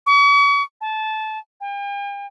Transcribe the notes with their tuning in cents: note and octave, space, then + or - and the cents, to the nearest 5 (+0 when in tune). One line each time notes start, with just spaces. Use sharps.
C#6 +40
A5 -20
G5 +45